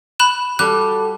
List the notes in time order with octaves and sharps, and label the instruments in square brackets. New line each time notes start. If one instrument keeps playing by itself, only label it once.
[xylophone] B5 F#6 E7
[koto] G3 [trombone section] F#4 A4 [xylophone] F#6